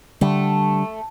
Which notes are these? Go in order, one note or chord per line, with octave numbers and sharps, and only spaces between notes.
D3 G3 A3